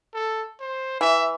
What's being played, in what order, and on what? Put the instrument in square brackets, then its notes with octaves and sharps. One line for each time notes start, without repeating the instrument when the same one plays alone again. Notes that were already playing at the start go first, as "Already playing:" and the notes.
[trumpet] A4
C5
[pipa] E3 [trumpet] E5